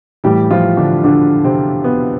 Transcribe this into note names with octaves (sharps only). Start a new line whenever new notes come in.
A2 E3 G3 G4
F3 F4
D3 D4
D3 D4
C3 C4
B3